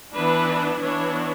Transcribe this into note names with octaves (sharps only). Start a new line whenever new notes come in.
E3 B3 D4 B4
E3 B3 D4 C#5